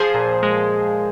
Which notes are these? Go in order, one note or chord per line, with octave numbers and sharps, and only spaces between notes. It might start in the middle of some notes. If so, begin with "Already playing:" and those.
Already playing: F3 G#4 C5
A#2
G#3